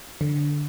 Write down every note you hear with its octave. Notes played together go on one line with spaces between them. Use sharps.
D3